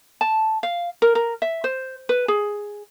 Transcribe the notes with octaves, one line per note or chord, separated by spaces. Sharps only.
A5
F5
A#4
A#4
E5
C5
B4
G#4